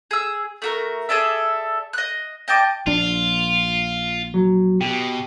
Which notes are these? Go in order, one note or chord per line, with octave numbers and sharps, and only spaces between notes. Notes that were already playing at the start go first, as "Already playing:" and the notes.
G#4 E6
A3 F#4 A#4
G#4 A4 D5 E5
D#5 F#6
D#5 G5 A5 D6
A#1 D4 F4
F#3
B2 G4